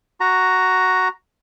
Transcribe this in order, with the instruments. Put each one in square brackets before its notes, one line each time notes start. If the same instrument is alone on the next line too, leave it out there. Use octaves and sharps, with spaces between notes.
[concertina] F#4 A#5